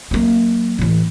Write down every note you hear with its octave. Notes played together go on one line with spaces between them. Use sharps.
F#3 A#3
A2 E3